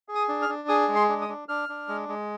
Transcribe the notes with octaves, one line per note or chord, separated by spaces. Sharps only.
G#4
D#6
D4
F6
D4
G#4 D#6
G#3
C6
D4
D#6
D4
D4 F6
D4
G#3
G#3